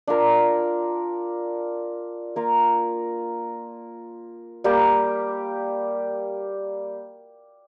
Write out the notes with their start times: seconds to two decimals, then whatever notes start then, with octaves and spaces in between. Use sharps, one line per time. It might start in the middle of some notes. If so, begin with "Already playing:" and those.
0.07 D4 F4 A#4 F5
2.36 A#3 F4 A#4 F5
4.64 G3 A#3 G4